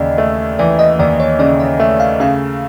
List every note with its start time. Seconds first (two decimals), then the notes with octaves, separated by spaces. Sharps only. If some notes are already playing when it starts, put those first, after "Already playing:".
Already playing: D#2 C#3 E3 D5 D#5
0.18 A3
0.59 E3 D5
0.79 D#5
0.99 D#2 D5
1.20 C#5
1.39 C#3 D5
1.60 D#5
1.80 A3 E5
2.00 F5
2.20 C#3 F5